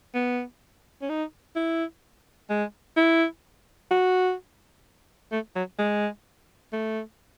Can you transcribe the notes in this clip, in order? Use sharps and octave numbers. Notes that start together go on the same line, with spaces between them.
B3
C#4
D#4
E4
G#3
E4
F#4
A3
F#3
G#3
A3